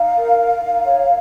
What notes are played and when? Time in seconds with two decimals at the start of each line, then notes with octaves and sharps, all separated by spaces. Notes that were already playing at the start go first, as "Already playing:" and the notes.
Already playing: D#4 F5
0.17 A#4
0.40 D#4
0.63 D#4
0.86 C#5